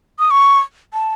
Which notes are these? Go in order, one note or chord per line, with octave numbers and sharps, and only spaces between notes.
D#6
C#6
A5